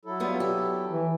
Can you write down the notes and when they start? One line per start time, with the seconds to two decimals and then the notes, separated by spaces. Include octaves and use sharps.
0.05 F#3 E4 A4
0.20 G3 B3 F4
0.40 G4
0.90 E3